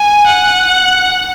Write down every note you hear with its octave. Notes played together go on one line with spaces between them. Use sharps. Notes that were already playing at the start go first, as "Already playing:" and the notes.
Already playing: G#5
F#5